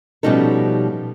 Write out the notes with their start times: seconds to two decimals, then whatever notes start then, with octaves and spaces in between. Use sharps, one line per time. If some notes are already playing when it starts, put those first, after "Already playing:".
0.23 B2 F3 G3 C#4 D#4 A4